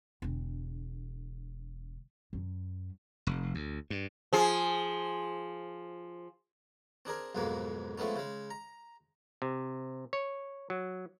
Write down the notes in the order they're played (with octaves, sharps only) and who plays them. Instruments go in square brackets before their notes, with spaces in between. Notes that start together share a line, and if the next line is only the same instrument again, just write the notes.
[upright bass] E1 D3
F#2
[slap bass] F1
D2
G2
[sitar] F3 G#4
[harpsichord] C4 D4 G#4 A#4
B1 F2 G#2 B2 G#3 A#3
F3 G#3 A3 B3 C#4
C#3 G#3
A#5
[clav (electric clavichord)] C3
C#5
F#3